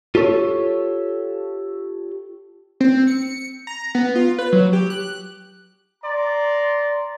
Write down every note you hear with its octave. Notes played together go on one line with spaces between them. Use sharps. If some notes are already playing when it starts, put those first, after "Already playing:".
F4 G4 A4 C#5
C4
C#7
A#5
B3
F4
B4
F#3
G4
F#6
D5 A#5 C6